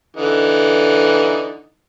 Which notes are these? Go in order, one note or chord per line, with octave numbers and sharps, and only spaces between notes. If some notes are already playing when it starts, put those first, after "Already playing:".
D3 E3 D#4